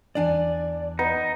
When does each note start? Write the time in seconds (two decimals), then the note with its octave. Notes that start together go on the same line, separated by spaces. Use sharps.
0.15 E2 D4 D5 G#5
0.99 B3 D#4